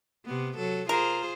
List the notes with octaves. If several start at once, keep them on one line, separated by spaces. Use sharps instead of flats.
C3 B3
F#3 A4
F4 G#4 A#4 C5